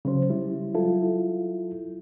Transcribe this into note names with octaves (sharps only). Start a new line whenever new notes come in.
C#3 F#3 C#4 C5
G3 E4
F#3 E4 F4 A4